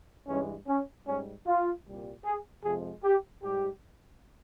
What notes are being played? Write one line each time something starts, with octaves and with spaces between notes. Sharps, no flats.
G2 E3 G#3 C#4
C#4
G#2 G3 C#4
F4
C2 A#2 G3
G#4
F2 C3 F3 G#3 G#4
G4
G#2 G3 G4